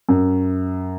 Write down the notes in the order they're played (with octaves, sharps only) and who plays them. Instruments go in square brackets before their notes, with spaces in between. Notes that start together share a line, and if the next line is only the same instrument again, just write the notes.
[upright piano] F#2